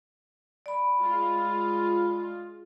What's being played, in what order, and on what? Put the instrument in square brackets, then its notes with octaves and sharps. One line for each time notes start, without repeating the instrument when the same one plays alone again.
[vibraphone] D5 B5
[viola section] G#3 F4